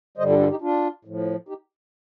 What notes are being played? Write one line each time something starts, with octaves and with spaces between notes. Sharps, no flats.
G2 D3 G3 C5 D#5
F4 A4
F4 A4
D#4 G4
D4 F4
A2 F3
D#4 G4